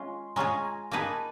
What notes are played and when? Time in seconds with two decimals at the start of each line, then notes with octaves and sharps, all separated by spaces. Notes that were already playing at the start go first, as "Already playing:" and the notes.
Already playing: G#3 C#4 F4 C6
0.36 G#3 C#4 F4 G#4 A#5
0.65 G#5
0.91 A#3 D#4 G#4 B4 A5